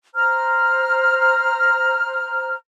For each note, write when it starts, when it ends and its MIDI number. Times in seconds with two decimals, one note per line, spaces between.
0.15 2.55 72
0.15 2.55 82
0.15 2.55 89